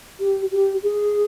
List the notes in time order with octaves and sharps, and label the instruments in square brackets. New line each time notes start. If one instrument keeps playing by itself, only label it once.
[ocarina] G4
G4
G#4